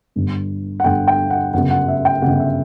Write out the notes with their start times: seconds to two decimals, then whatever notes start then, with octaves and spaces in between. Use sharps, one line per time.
0.16 G1 G2 D3
0.80 F#5
0.84 G1 G2 D3 G5
1.08 G5
1.30 F#5
1.54 G1 F#2 C#3 F#5
1.71 F#5
1.88 E5
2.05 G5
2.22 G1 F#2 C#3 F#5
2.40 E5